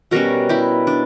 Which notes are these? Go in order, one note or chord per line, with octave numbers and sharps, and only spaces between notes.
B2 G3 C#4 F#4 A#4
E4 G4
D4